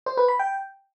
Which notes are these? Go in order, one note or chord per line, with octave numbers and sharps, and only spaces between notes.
C5
B4
B5
G5